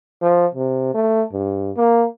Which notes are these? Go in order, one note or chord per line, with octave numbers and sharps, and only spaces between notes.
F3
C3
A3
G2
A#3